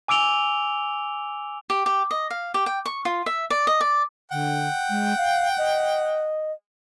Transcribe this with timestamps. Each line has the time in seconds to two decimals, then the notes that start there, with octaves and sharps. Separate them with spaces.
0.08 G#5 D6 E6 D7 F7 G7
1.70 G4
1.86 G4
2.11 D#5
2.31 F5
2.54 G4
2.66 G5
2.86 C#6
3.05 F4
3.26 E5
3.50 D5
3.67 D#5
3.81 D5
4.32 D3 F#5 G5
4.90 G#3
5.17 F5
5.58 D#5